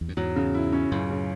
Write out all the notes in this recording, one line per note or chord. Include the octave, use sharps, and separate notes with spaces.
E2
F#2
E2 G#2 F#3
C#3
E4
C#4
C#2 F#2 A2
C#3